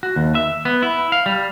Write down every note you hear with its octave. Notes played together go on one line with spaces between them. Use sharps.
F#4
D#2
E5
B3
E4
F5
G3